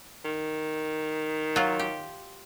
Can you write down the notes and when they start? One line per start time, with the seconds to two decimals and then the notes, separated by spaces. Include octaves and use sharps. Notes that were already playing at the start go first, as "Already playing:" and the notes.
0.24 D#3
1.56 F#3 F4
1.79 G4